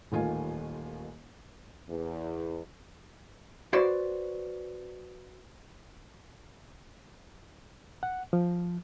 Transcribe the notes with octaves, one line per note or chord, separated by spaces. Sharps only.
D#1 A1 D#3 F4 G#5
E2
F#4 B4 C5 D5
F#5
F3